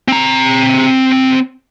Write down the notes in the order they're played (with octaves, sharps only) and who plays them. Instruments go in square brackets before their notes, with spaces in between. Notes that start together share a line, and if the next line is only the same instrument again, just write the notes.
[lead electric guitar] C4 A#5